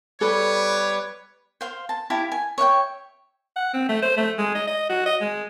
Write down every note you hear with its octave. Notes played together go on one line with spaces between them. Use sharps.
G3 B3 A4 B4 C#5 D6
C5 F5 C6
A5
E4 G4 F5 A5
G#5
C#5 E5 F#5 G5
F#5
C4
A3
C5
A3
G#3
D#5
D#5
F#4
D#5
G#3